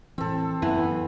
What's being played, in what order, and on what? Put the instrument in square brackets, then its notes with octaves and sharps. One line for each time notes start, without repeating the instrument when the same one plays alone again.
[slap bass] A2 E3 [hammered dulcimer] C4 A4
[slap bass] F#2 [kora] E3 [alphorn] B3